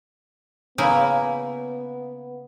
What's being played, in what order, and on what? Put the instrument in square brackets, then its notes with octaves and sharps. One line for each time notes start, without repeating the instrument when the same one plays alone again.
[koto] C#3 A#3 E4 [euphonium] B3